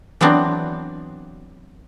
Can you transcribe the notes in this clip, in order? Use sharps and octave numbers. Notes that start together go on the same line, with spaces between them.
E3 F#3 B3 C4 D4